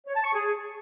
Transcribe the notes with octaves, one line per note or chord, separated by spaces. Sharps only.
C#5
A5
C#6
G#4